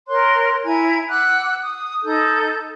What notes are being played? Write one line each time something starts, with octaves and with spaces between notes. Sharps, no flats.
A#4 C#5 C6 F#6
E4 G#5 A#5 G#6
F#5 D6 E6 F#6
D#6
D#4 A4 G6